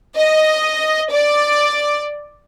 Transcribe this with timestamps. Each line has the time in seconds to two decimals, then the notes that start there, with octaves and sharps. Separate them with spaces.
0.16 D#5
1.11 D5